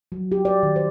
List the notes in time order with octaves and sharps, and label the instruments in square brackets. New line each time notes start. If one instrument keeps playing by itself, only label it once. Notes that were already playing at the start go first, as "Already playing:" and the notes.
[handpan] F#3
G4
D5
D#3
C5